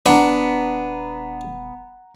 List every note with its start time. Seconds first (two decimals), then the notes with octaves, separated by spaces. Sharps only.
0.06 D#1 B3 D4 F#5 A#5